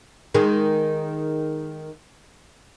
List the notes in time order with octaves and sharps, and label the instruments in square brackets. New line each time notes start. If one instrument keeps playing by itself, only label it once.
[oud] D#3 G#3